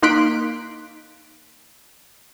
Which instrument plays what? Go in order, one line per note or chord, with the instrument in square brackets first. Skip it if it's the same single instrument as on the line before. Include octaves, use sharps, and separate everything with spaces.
[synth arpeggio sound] A#3 D#4 C6 F#6 B6 D7